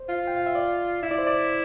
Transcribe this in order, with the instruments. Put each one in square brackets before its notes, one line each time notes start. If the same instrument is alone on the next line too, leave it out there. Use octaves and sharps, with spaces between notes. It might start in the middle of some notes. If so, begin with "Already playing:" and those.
Already playing: [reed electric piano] C5
[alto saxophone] F4
[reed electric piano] G5
F5
E5
D5
[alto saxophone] E4 [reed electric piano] E5
[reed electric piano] D5
C5
D5